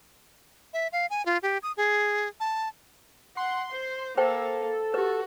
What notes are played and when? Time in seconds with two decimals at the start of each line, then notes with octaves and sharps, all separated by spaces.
0.73 E5
0.92 F5
1.10 G#5
1.26 F4
1.43 G4
1.63 D#6
1.77 G#4
2.40 A5
3.37 F#5 C6
3.72 C5
4.17 A#3 A4 C5 G5
4.94 F#4 G4 B4